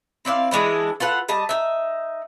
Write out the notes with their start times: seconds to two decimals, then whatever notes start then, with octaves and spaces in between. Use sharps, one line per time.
0.25 C4 E4 D5 F5
0.51 E3 G#3 D4 E4
1.00 F4 A4 B4 F#5
1.29 G3 D#5 A5
1.49 D#4 E5